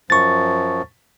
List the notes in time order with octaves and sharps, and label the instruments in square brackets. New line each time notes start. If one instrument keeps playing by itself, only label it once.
[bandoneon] F#2 F3 [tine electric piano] C#6 A6